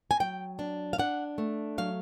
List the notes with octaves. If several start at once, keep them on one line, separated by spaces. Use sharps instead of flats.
G#5
F#3 G5
D4
F5
D4 F#5
A3
F#3 F5